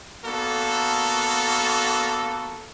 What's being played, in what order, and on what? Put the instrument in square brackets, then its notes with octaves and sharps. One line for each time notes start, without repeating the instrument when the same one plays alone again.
[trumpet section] A#3 B3 D4 F#4 A4